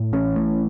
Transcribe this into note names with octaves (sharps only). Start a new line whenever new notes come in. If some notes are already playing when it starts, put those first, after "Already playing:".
Already playing: A2
A1 C#4
A2